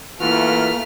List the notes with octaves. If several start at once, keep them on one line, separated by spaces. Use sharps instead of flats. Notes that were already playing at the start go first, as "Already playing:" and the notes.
E3 A3 A#3 F4 F#4 F6